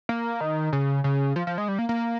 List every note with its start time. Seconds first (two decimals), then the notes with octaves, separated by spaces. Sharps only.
0.09 A#3
0.41 D#3
0.73 C#3
1.04 C#3
1.36 F3
1.47 F3
1.58 G#3
1.68 G3
1.79 A#3
1.89 A#3